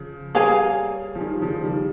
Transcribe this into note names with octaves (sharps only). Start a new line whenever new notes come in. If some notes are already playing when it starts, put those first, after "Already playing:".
Already playing: C#3 F3
G3 A#3 G#4 C#5 F5 G#5
F3
D#3 G3
C#3 F3
D#3 G3